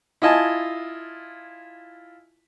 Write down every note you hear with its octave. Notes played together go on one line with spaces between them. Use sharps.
E4 F4 D#5 G#5 A5